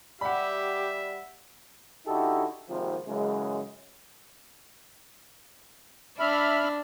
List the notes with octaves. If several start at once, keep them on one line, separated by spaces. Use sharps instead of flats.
G3 G4 E5 F#5 B5
D3 D#4 E4 F#4 G4 A4
G#1 D#2 C3 F3
F#2 C#3 E3 G#3
D4 E5 B5 F6